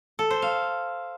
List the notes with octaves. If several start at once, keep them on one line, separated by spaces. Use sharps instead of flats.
A4
C5
F5